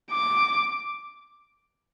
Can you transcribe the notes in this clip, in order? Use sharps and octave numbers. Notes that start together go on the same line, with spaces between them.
D6